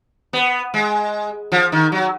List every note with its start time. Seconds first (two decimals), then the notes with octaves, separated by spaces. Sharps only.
0.33 B3
0.74 G#3
1.52 F3
1.72 D#3
1.92 F#3